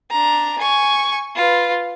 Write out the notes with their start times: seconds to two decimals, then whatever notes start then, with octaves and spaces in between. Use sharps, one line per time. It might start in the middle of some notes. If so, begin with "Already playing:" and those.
0.11 D4 A#5
0.59 G#5 C#6
1.35 F4 B4